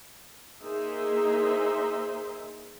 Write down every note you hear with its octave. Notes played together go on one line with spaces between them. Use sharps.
A#3 D#4 G#4 C5 E5